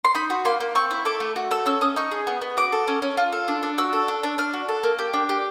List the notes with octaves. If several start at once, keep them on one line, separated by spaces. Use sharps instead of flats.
C6
D#4 B5
F#4
A#3 C6
A#3
C4 C#6
E4
A4 D6
A3
F#4
A4 E6
C#4 E6
C#4 D#6
D#4 C#6
G#4
B3
B3
F#4 D6
A4
C#4
C#4
F4
A4
D4
D4
F#4 E6
A4
D4
D4
D4 F6
F#4
A4
A#3
G4
D4
G4